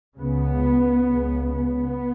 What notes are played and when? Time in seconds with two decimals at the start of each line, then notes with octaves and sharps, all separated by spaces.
0.19 C#2 C#3 B3
1.08 C#2 C#3
1.54 B3